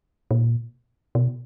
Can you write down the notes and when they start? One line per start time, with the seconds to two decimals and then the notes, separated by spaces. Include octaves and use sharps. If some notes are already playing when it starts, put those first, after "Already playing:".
0.31 A#2
1.15 B2